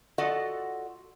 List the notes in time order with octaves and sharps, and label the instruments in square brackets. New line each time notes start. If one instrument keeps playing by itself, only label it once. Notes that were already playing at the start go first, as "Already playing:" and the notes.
[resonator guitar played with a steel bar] F4 F#4 A4 D5 D#5 F#5